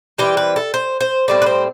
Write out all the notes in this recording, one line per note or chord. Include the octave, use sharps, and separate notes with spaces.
E3 G3 C4 G4
B4
A4
C5
C5
A2 G3 C4 D5
B4
C5